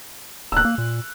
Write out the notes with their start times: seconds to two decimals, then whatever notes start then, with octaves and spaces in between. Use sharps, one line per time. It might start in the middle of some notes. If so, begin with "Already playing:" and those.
0.52 D1 E6 F#6
0.65 A#3
0.78 A#2